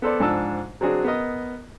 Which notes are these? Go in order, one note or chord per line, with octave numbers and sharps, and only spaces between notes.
B3 A4 C5 D5
G#2 F3 D4 A5 E6
F#3 C4 D4 F#4 G#4
B3 A#4 D#5